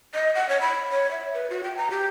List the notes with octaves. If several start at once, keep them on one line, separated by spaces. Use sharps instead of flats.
D#5
F#5
C#5
B5
C#5
E5
B4
F#4
G5
A#5
G4